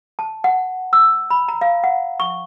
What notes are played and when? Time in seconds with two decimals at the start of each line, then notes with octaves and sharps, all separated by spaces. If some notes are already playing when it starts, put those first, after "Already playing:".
0.19 A5
0.44 F#5
0.93 E6
1.30 B5
1.48 A#5
1.61 F5
1.84 F#5
2.20 C#6